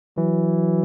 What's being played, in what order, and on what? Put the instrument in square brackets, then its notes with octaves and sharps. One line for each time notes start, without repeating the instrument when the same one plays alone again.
[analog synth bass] E3 [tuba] F#3